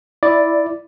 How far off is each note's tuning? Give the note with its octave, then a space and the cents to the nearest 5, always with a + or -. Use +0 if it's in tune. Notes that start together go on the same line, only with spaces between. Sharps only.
E4 +0 D5 +0